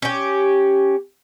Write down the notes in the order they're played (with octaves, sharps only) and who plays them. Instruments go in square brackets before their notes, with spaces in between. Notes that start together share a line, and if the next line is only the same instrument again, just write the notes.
[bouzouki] C#4 G4